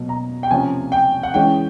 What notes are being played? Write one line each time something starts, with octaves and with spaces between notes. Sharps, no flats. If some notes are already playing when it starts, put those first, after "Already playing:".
Already playing: B2 F#3 A#3
A#5
G5
C3 F3 A#3 C#4 G#5
G5
F#5
E3 G#3 C#4 G5